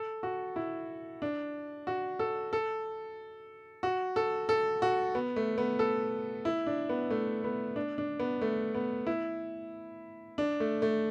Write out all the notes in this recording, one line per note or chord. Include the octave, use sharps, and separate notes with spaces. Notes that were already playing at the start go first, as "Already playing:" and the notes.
Already playing: A4
F#4
E4
D4
F#4
A4
A4
F#4
A4
A4
F#4
B3
A3
B3
A4
E4
D4
B3
A3
B3
D4
D4
B3
A3
B3
E4
D4
A3
A3